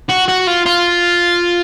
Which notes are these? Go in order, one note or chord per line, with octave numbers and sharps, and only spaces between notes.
F#4
F#4
F4
F4